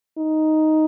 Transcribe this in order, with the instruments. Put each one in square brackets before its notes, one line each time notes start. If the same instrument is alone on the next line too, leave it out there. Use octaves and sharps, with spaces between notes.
[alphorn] D#4